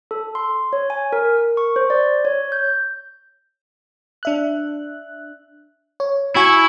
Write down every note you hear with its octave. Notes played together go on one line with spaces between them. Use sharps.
A4
C6
C#5
G#5
A#4
A#4
C#6
C5
D5
C#5
G6
D4 E5 F#6
C#5
E4 F#4 G#5 C#6